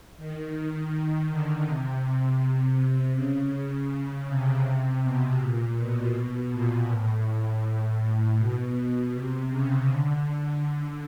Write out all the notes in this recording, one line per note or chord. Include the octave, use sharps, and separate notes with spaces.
D#3
D#3
D3
C3
C3
C#3
C3
B2
A#2
B2
A#2
A2
A2
B2
C3
C#3
D3
D3